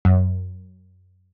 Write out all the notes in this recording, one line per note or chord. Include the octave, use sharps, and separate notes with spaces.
F#2